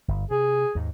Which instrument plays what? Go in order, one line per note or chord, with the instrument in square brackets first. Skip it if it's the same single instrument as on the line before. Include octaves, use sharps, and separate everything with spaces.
[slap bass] G1
[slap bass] C3 [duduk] G#4
[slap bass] D#2 G#2